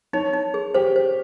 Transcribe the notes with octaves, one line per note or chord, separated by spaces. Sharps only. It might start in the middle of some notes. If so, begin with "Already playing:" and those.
D#4 C#5
D#4
G#4
G4 C5
C5